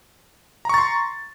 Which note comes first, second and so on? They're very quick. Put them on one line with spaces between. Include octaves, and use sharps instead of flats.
A#5 C#6 A6 C6